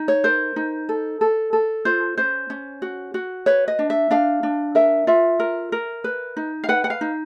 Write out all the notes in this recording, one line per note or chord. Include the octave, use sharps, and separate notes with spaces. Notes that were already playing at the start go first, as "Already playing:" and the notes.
Already playing: D#4
C#5
A#4 C5
D#4
A4
A4
A4
F4 C5
C#4 C5
C#4
F#4
F#4
B4 C#5
D#5
D4
E5
D4 F5
D4
A#4 E5
F4 E5
A#4
A#4
B4
D#4
F5
B4 F#5
F#5
F5
D#4